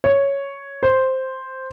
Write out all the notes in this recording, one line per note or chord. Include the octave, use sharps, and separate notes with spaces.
C#5
C5